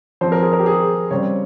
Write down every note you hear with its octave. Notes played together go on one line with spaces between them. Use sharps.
F3 C4 C5
A#4
G#4
A#4
G4
G#4
C#3 G3 C4 C#5